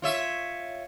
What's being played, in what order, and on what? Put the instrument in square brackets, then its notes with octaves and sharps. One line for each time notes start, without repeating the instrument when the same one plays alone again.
[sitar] F4 C#5 E5